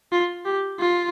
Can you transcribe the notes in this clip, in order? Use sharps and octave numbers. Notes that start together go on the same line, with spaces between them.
F4
G4
F4